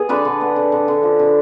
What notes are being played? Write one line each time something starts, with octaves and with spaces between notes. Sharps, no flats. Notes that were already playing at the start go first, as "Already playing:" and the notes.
Already playing: B3 G#4
D3 B4 D5
D3
B3
D3
D3
D3
F3
D3